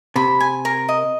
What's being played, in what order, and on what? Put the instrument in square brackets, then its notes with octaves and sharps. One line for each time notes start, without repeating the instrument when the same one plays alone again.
[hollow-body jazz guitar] C3 [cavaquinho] B5
[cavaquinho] G#5
A#4
D#5